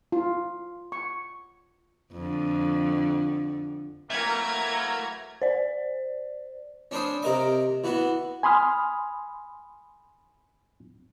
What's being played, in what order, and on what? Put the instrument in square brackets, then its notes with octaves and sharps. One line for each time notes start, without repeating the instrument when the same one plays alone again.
[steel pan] F4
C#6
[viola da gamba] F2 D3
[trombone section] E3 F#3 A#3 [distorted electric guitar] A3 [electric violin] A#4 G#6 [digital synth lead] E5
[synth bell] C5 D5
[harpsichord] C#4 D4 C5 B5 D#6
C3 A#4 D#5 D6
E3 B3 F#4
[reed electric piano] G#5 B5 C6 D#6 F6